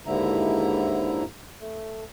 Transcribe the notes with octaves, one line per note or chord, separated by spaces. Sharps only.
D#2 G#2 D3 E4 A#5
A3